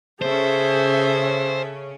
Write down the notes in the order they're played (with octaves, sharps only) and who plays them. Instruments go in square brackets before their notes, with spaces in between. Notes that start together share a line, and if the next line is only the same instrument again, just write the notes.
[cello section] C#3 C#4 [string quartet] G#4 A4 E5 [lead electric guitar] C5